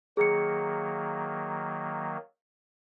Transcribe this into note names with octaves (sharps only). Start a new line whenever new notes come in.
D#3 F#3 A#3 G#4 C#7